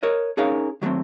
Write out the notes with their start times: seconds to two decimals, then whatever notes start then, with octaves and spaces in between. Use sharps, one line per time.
0.03 A#4 C#5 D#5
0.37 C#4 D#4 G#4 A#4 C#5 F5
0.82 D#3 F#3 G#3 A3 C4